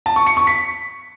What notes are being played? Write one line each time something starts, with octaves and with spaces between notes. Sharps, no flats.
A5
C#6
C#7
C#6
B6